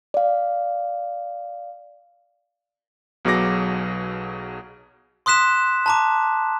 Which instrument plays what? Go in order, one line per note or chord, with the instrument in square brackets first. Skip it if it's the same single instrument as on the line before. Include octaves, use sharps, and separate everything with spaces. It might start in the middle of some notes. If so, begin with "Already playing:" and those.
[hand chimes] D5 F5
[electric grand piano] B1 B2 F#3 G#4 D6 A#6
[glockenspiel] C6 D#6 F#6 B6 E7
A5 A#5 D6